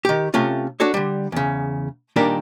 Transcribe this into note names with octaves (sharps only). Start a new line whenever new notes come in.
D#3 G4
C3 A3 C#4 F4
D4 F#4 A4 C#5
D3 G3
E2 C#3
A#2 D#3 G3 D4 G4 A#4